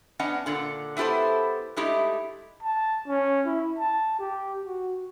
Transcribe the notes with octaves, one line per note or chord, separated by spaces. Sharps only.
B3 C#4 D4 D#5 F#5
A#2 D3 F#5
B3 E4 G4 A4 C5
G#3 A3 D#4 E4 G4
A5
C#4
E4
A5
G4
F#4